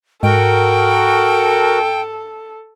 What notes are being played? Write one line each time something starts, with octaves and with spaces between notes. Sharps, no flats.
G#2 F#4 A4 A#4 G5